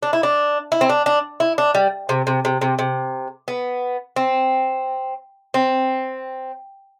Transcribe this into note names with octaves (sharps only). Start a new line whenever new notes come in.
D4
E4
D4
E4
C4
D4
D4
E4
D4
G3
C3
C3
C3
C3
C3
B3
C4
C4